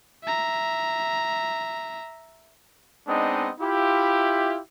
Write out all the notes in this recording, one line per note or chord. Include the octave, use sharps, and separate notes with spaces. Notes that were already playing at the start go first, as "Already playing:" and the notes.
E5 A#5
G#3 B3 C4 D4 D#4 D#5
E4 F4 G4